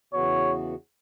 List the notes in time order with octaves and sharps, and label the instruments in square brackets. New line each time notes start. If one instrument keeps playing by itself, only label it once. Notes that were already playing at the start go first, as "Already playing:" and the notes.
[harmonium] E2 C#3 E3 B3 F#4 [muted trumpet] C#5